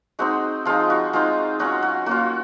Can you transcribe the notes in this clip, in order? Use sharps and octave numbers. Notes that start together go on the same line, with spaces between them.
G#3 C4 D#4 F#4
F3 G#3 D#4 F4
F#4
G#3 C4 D#4 F4
F#3 C#4 F4 F#4
F#4
A#3 C#4 F4 F#4